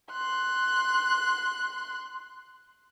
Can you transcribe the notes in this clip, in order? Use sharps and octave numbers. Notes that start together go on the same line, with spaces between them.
C6 F#6